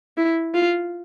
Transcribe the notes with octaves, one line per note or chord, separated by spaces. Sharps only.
E4
F4